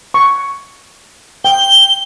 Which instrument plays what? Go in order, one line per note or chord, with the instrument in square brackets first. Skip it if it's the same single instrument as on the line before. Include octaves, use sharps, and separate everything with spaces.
[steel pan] C#6
[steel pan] G5 [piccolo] G7